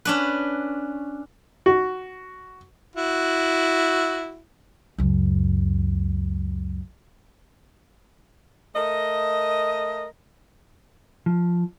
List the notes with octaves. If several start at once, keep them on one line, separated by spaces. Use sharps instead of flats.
C#4 D4 B4
F#4
E4 F#4
C#2 F#2
A3 A#4 D#5
F3